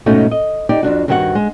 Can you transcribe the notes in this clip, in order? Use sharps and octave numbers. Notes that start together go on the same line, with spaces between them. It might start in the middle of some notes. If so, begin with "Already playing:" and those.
G#2 B2 A3 C#4 D#4 F#4
D#5
D#4 G4 D5
F2 G#2 D4 F#4
G2 D#3 C4 F#4 B4 F#5
G#3